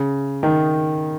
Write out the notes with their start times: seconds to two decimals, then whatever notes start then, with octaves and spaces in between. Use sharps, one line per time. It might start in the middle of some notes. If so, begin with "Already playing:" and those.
Already playing: C#3
0.43 D#3